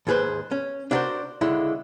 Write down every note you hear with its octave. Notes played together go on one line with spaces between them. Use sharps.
D#2 G#2 G#4 B4 C5
C#4
D4 E4 F#4 A4 A#4 C5
C#2 D3 G#3 E4